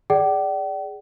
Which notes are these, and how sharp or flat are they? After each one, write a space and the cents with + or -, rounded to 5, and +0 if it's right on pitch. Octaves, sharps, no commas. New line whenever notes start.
G#4 +0 D5 +0 G5 -45